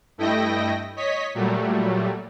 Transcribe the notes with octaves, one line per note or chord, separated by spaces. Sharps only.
G2 A3 E4 D#5 G5 A#6
C#5 D#5 B6
A#2 F#3 G3 A3